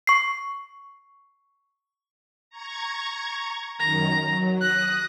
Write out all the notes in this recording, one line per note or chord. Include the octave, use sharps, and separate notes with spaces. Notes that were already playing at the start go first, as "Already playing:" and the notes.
C#6 C7
A#5 C#6 G#6
F#2 D#3 A#5
F#3
D#6 F#6 A#6